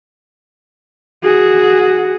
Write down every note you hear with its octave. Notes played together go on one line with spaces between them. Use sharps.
F#4 G#4